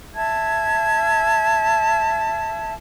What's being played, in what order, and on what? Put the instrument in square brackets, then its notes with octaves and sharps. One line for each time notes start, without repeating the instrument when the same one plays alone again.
[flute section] E5 A5 G#6